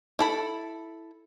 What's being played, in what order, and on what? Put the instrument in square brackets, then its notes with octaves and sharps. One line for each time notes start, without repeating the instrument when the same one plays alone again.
[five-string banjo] E4 A4 B5